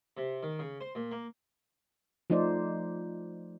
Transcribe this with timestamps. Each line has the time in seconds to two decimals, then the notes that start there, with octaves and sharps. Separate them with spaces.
0.17 C3
0.43 D#3
0.59 C#3
0.81 C5
0.95 A#2
1.11 A#3
2.30 F3 A3 D#4 C5 D5